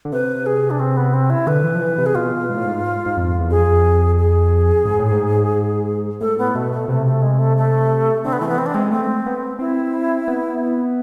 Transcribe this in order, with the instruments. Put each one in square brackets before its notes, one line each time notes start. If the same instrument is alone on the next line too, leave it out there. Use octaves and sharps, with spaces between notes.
[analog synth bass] D3
[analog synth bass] C3 [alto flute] B4
[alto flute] G#4
D4
C4
B3
C4
E4
[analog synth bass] D3 [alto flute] B4
[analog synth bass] E3
F3
E3
C3
[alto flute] G#4
[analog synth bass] B2 [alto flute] F4
[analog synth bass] G#2
A2
G#2
G#2
F2
E2
[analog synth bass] F2 [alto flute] G#4
[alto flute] G#4
[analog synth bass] G#2
A2
G#2
[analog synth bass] A2 [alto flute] A4
[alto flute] B3
[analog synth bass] B2 [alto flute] A3
[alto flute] A3
[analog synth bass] C3 [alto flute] A3
[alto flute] A3
G#3
A3
A3
[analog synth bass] D3 [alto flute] C4
[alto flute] B3
[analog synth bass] E3 [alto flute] A3
[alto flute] B3
C4
D4
[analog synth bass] G#3 [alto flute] C4
[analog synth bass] A3 [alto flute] C4
[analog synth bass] B3
[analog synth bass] C4 [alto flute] E4
[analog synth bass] B3